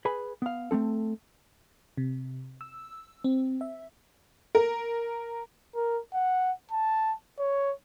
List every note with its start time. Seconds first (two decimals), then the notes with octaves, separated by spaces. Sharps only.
0.05 G#4 B4 G#5 B5
0.42 B3 F5
0.71 A3 A#3 C4 A4
1.97 C3
2.61 E6
3.24 C4
3.61 E5
4.55 A#4
5.75 A#4
6.14 F#5
6.71 A5
7.39 C#5